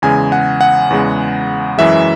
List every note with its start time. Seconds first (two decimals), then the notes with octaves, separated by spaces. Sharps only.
0.02 E2 C#3 G#3 G#5
0.32 F#5
0.61 F#5
0.90 E2 C#3 G#3
1.78 F#2 E3 G#3 E5